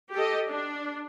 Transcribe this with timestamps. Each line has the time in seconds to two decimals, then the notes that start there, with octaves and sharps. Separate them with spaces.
0.13 G4 A4 D#5
0.49 D4